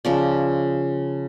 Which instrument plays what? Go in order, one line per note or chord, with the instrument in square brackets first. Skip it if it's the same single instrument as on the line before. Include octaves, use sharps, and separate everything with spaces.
[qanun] C#3 F3 D5